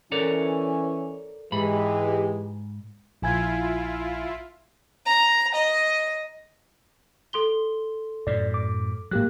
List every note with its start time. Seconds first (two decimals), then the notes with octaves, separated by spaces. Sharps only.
0.12 E3 C#4 A4 A#4 D5
1.52 G#2 E3 G#3 G4 B5
3.22 A#1 E4 F4 G#5 G#6
5.06 A#5
5.55 D#5
7.33 A4 C6 G7
8.27 F#2 A2 D5
8.54 D6
9.11 G#2 F#3 A#3 G4 F#6